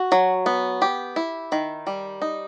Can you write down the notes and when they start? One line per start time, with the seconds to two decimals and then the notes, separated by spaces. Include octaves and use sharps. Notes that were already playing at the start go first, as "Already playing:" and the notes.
Already playing: F#4
0.12 F#3
0.46 B3
0.82 G4
1.16 E4
1.52 D#3
1.87 G3
2.22 D#4